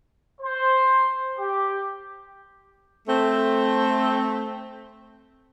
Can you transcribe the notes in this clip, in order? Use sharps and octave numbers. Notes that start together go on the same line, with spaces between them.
C5
G4
A3 C4